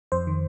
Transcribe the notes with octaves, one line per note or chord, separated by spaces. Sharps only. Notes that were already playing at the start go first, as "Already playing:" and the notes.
F2 C5
D#3